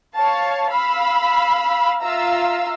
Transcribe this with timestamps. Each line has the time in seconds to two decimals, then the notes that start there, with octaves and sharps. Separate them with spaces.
0.16 C#5 F5 A5
0.70 F5 B5 E6
2.02 F4 E5 F5 A#5 E6